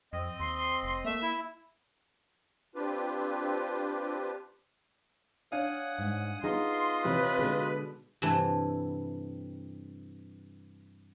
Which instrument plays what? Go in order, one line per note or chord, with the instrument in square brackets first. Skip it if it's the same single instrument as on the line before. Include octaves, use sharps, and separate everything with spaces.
[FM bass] F2 [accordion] C4 D#5
[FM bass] D#2 [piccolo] C6
[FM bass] F1
[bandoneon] A3 [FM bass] A#3 [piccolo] E5
[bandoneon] E4
[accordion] C4 D4 F4 G4 B4
[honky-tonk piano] D4 C#5 F5 [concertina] F#5 G#5 D#6
[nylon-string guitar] G#2
[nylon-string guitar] B3 D#4 G#4 [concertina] F4 D#5 [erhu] C6
[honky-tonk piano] D#2 C3 E3 [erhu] B4
[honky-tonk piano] B2 [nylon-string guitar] D3 G#3 G#4
[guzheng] G2 C3 E3 A3